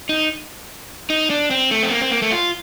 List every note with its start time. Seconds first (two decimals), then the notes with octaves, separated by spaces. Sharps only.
0.09 D#4
1.10 D#4
1.30 D4
1.51 C4
1.71 A3
1.83 C4
1.91 A#3
2.01 C4
2.11 A#3
2.22 A3
2.32 F4